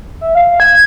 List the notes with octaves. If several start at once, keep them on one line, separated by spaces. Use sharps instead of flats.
E5
F5
G#6